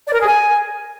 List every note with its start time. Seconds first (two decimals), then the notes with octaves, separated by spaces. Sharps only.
0.07 D5
0.14 A#4
0.20 G#4
0.27 G#5